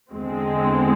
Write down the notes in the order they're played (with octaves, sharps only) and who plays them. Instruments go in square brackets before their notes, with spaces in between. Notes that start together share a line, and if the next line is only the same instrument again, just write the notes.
[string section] E2 D3 G#3 C4